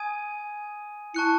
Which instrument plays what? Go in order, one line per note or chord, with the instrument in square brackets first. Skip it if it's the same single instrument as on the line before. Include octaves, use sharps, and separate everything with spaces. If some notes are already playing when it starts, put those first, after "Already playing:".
Already playing: [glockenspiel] G#5 D#6 G#6 D#7
[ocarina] E4 [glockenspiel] A5 C#6 F#6 C#7